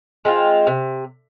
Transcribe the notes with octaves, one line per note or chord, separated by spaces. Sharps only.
G#3 C4 F4
C3